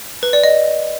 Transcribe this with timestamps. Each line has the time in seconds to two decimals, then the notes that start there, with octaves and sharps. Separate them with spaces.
0.23 B4
0.33 D5
0.43 D#5